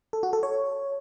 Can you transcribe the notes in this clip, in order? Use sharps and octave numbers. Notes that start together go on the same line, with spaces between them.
A4
F#4
A4
C#5